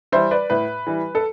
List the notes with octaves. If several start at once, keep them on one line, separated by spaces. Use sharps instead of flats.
E3 G3 C5 E5
B4 D5
A2 B4
E3 G3
A4